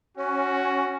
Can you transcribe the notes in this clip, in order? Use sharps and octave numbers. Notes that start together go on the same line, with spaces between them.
C#4 F#4